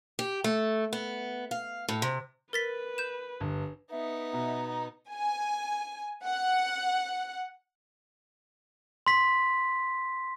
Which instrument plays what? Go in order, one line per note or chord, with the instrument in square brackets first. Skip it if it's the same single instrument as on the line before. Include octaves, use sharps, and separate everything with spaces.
[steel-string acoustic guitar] G4
A3
B3
F5
A2
C3
[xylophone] A#4 A6 B6 [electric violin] B4
[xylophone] G6 E7
[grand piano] G1
[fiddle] B3 D#4 [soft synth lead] E5
[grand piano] B2 [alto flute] A#5
[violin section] G#5
F#5
[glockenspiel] C6 B6